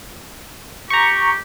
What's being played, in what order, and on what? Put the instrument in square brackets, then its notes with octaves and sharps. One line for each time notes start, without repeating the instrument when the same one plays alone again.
[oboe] G4 [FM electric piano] A#5 C#6